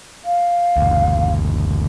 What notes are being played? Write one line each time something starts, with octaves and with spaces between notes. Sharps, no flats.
F5
F#1 D2